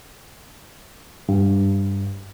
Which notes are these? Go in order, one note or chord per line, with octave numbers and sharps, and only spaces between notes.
G2